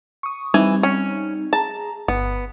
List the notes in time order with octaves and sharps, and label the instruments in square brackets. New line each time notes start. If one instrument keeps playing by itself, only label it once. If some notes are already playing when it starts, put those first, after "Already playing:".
[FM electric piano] C#6 D#6
[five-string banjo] E3 G#5 [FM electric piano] G3 C4 D#4
[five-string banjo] C#4
[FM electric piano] G#4 A#5 [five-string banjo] A5
[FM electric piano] G1 [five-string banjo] B3